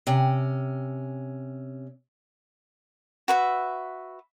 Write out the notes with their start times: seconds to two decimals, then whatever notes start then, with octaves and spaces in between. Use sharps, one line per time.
0.07 C3 C#4
3.28 F#4 B4 E5